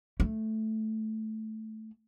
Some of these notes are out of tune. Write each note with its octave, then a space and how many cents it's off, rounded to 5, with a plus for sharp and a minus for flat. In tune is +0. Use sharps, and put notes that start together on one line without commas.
A3 -5